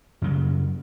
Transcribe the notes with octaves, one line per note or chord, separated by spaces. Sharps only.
F#2 C#3 F#3 G3